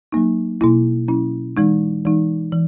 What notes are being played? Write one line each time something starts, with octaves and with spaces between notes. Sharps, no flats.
F#3 A#3 D#4
B2 A#3 E4
F#3 C#4 E4
E3 G#3 D#4
E3 G#3 D#4
E3